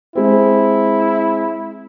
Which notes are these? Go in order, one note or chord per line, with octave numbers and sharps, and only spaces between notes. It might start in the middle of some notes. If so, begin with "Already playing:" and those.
G#3 C4 E4